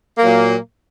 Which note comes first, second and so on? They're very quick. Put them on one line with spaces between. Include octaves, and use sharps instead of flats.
A#3 F#3 A#2